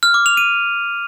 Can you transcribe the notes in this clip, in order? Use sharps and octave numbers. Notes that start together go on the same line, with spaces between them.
F6
D6
F7
D#7